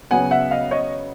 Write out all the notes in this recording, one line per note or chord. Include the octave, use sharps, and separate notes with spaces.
C#3 F#3 B3 F#5 G#5
E5 F#5
D#5 F5
C#5 D#5